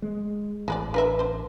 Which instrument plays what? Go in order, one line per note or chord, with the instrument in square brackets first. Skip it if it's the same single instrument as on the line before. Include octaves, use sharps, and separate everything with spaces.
[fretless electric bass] G#3
[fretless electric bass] A1 [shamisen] G#3 B4 D5
[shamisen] D4 A#4 E5 [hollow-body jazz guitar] B4
[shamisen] D4 C5